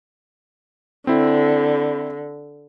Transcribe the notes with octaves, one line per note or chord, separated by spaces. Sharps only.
D3 C4 E4